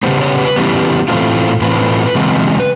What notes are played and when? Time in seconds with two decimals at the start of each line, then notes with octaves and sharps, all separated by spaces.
0.03 C#3 E3 G3 B3 C5
0.20 C#5
0.38 B4
0.56 C#3 E3 G3 B3
1.08 A2 E3 A3 C4 F4
1.61 A2 E3 A3 C4 F4 B4
2.15 C#3 E3 G#3 C4
2.60 B4